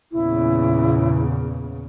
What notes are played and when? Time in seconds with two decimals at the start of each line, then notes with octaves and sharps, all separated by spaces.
0.12 E2 A#2 C#3 E4